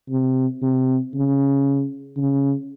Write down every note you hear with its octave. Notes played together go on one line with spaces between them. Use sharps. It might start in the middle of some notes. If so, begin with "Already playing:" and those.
C3
C3
C#3
C#3